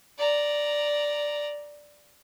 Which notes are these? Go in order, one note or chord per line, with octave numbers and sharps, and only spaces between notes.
D5 A#5